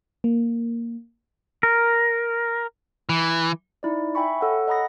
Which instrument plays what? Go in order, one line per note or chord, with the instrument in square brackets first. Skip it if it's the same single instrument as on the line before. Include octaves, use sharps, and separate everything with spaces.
[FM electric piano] A#3
[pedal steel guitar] A#4
[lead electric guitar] E3
[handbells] D#4 E4 D5
E5 G5 G#5 B5 C#6
A4 C#5 F#5
D#5 F#5 A#5 B5 D#6 A#6